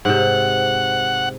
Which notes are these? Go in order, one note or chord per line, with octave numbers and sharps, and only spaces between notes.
G#2 C3 F#5